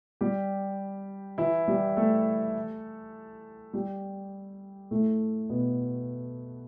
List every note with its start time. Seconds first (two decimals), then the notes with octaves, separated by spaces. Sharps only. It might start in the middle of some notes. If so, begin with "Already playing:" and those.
0.21 G3 G4
1.38 E3 E4
1.68 G3 G4
1.97 A3 A4
3.73 G3 G4
4.91 A2 A3
5.49 B2 B3